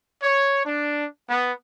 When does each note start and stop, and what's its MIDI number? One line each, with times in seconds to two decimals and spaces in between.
0.22 0.61 73
0.66 1.06 62
1.29 1.51 59